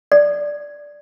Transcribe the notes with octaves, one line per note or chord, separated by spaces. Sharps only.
D5